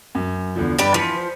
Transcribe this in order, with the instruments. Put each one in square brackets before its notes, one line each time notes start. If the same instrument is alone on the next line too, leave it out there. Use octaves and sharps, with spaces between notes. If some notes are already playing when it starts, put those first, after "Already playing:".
[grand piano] F#2
E2 D3 F3
[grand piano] G2 [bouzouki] D4 G4 B4
[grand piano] E3 B6 C#7 [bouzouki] F3
[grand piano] C5